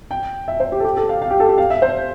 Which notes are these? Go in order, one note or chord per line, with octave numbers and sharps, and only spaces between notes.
G5
E5
C5
G4
A4
G4
A4
F5
F5
G4
A4
G4
F5
E5
C5